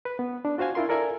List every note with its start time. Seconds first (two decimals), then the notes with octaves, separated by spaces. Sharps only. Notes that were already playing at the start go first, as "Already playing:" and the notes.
0.05 B4
0.19 B3
0.45 D4
0.58 F4 F#4 C5 F5 G#5
0.75 D4 E4 F4 A#4 C6
0.89 A4 A#4 D5 E5 G#5 A#5